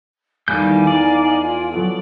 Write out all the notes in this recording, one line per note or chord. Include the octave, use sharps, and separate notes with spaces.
E2 D#3 G3 A3 B3 F5 G#5 G6
D#4 D5
F4
F#3 B3 F4 A4